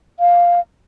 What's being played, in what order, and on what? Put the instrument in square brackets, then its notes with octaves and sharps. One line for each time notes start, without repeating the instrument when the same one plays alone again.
[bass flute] F5